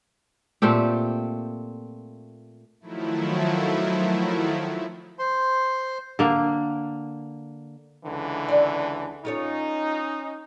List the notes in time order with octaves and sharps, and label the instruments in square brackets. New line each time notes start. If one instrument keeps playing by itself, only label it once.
[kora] A#2 A3 C4 G4
[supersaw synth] D#3 F3 F#3 A3 E4
[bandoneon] C5 C6
[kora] D3 A#3
[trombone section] C#2 D3 E3
[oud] D5
[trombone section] C#4 D#4 [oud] F4 A4 C#5